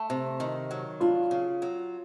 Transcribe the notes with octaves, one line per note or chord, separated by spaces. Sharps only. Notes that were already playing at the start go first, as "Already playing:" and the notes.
Already playing: A3
C3
D#3
F#3
D4 F4
C#3
F#3